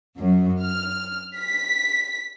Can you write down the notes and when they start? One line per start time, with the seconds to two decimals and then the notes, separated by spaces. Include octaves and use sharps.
0.18 F#2
0.62 F6
1.38 B6